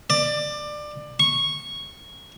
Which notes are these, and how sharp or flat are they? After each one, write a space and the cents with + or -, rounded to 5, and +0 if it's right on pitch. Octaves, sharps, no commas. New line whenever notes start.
D5 +20
C#6 -10